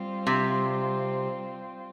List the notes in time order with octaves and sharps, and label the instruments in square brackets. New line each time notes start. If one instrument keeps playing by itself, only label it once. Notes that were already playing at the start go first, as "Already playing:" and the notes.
Already playing: [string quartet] G3 C4 F4
[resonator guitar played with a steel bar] C3